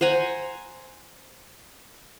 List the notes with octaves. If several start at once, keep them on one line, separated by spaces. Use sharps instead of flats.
C5 F#5 G#5 A#5